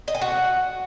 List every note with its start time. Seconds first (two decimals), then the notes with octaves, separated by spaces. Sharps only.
0.08 D#5
0.15 G#5
0.21 F#4